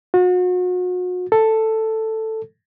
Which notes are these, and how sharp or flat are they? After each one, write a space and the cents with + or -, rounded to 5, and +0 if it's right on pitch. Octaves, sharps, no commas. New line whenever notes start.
F#4 -35
A4 +5